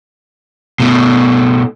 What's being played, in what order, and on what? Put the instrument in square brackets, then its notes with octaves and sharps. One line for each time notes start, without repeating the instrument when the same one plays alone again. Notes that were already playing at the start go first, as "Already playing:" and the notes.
[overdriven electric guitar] B2 A3